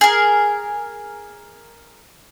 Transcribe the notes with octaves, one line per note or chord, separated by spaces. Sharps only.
G#4 A#4